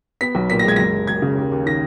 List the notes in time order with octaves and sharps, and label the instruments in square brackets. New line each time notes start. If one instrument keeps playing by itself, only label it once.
[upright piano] B3 B6
B1
A#2 B6
A#6
G#3 G#6
F#1 A#6
F#1
F#2 G#6
C#3
D#2
D#2
D#3 A#6